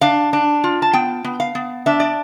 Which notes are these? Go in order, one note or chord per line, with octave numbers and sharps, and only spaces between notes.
D4 F5
D4
F4
A5
B3 G5
B3
F5
B3
D4 E5
D5